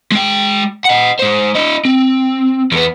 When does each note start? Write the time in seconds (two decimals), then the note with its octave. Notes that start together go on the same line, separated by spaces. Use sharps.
0.12 G#3 G5
0.85 D#5 F#5
1.19 G#3 C5
1.55 E4 D#5
1.85 C4
2.72 E2 B3